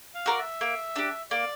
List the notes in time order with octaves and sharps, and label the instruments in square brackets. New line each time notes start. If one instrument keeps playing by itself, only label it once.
[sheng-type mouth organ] F5
[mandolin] F#4 A#4 D5
[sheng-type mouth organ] E5
[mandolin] A#3
D4 G4
[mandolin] A#3 [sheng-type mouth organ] D5